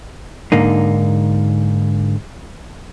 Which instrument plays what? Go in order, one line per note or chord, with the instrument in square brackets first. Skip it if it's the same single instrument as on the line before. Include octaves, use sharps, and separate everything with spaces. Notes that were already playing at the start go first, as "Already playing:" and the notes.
[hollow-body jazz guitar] G#2 D3 A#3 D#4